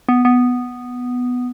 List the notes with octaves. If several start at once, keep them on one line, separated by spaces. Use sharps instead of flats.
B3
B3